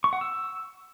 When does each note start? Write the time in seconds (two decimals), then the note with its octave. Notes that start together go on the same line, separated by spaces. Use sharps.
0.04 C#6
0.13 F#5
0.21 E6